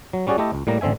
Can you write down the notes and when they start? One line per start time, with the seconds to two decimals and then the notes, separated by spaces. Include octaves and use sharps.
0.13 F#3
0.27 G3 C#4 F#4 G#4 D5
0.38 A3 E4 G4 A4 D#5
0.53 C#2
0.67 A2 G3 A#3 A#5
0.81 A1 D3 C4 E5 G#5